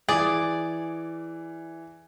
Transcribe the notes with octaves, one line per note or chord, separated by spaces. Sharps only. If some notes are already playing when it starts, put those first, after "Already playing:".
E3 G#4 D5